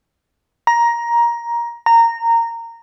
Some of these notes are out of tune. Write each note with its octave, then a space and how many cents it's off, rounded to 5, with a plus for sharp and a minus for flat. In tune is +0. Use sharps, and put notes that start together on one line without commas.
A#5 +15
A#5 -15